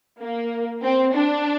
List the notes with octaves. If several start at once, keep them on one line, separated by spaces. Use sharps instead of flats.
A#3
C4
D4